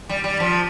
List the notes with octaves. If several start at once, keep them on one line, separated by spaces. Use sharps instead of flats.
G3
G3
F3